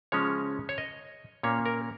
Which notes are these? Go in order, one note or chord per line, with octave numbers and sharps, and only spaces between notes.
C#3 F3 G#3 C#4 C#5
C#5
D#5
A#2 A#3 C#4 C#5
A#4